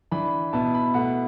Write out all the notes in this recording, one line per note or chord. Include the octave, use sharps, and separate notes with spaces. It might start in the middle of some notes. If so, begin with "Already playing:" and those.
E3 D4 B5
B2 B3 E4 A5
B5
B2 A3 E4 F#5